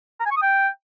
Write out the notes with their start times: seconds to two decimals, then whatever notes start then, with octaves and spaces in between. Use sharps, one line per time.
0.20 A#5
0.26 G#5
0.31 C#6
0.37 D#6
0.42 G5